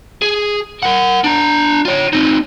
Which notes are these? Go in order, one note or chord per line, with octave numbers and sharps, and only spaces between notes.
G#4
A#4 F#5
D4 A#5
F4 C#5
C4 D#4